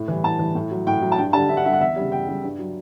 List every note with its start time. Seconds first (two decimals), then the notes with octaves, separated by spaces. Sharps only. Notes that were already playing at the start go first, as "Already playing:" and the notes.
Already playing: A2
0.08 E3 G3
0.24 A2 A5
0.39 E3 G3
0.55 A2
0.71 F#3
0.87 A2 G5
1.02 F#3
1.12 A5
1.18 G2 G5
1.33 D3 G3 A5
1.49 G2 E5
1.57 F#5
1.65 D3 G3 E5
1.73 F#5
1.81 E2 E5
1.96 C#3 G3
2.12 E2 G5
2.28 C#3 G3
2.44 G2
2.59 F#3